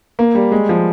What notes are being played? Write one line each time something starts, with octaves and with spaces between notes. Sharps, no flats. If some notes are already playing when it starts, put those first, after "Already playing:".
A#3
G3
G#3
F3